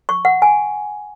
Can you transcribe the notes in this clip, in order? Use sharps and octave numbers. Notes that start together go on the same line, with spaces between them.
C#6
F#5
G#5